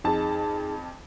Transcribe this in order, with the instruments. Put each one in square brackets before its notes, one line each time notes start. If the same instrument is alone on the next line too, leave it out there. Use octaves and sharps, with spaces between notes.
[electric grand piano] F2 A5 [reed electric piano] D#4 G#4